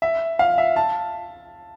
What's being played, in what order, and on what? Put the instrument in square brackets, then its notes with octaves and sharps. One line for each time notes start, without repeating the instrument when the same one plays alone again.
[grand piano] E5
F5
E5
A5